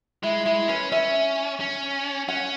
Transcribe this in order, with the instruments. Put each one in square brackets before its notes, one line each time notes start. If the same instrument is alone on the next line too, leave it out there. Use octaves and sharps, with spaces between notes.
[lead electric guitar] G#3 [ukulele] E4
[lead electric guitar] G#3 [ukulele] E4
[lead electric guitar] C#4 [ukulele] B4
[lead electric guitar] C#4 [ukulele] E5
[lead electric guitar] C#4
[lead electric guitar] C#4 [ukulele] F#5